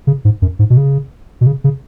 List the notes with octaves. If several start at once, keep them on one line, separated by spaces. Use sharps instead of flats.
C#3
G#2
F#2
G#2
B2
C#3
B2
C#3
C#3